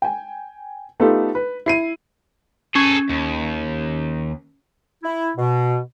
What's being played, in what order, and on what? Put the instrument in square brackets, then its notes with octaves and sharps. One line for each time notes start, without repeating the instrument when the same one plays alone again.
[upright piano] G5 G#5
A3 B3 D#4 F4 G4 A4
B4
E4 C7 D#7
[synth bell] C#4 [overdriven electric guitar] G#4 A4
[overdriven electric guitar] D#2
[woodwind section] E4
B2